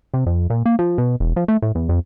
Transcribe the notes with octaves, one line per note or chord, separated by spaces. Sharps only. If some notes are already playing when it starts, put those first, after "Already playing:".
C3
F2
A#2
A#3
F3
B2
E1
F3
A3
A2
E2
F2